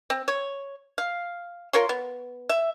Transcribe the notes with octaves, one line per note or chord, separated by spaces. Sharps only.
C4
C#5
F5
F4 A#4 C#5 C6
B3
E5